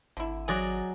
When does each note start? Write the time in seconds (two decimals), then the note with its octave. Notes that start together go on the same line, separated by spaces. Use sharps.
0.17 G#1 D3 E4
0.48 F#3 G#4 D5 D#5